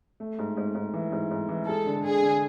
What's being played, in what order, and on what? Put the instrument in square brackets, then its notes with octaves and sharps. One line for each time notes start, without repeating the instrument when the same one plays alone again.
[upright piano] A3
G#2
G#2
G#2
E3
G#2
G#2
E3
[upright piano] G#3 [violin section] A4
[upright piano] D3
[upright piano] D3 [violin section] G#4
[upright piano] D3